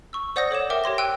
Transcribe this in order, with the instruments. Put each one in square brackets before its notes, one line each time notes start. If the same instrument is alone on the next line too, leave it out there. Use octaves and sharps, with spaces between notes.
[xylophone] C#6 E6
C5 D5 F#5 D#6 G6 A#6
A4 C#5 D6 E7
A#4 E5 G5 D6
G4 C#5 C6 A#6
G5 E6 F#6 D#7